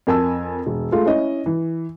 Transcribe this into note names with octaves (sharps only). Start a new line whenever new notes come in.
F2 A#4 G#5 A5 E6
E1
G#3 A3 F4
C#4 E4 D#5
E3